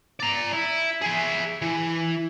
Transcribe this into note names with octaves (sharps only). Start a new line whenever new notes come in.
D5 A#5
E4
G#4 E5
E3